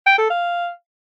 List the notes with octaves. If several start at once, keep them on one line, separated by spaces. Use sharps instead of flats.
G5
A4
F5